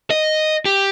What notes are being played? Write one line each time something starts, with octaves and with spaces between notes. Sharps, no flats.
D#5
G4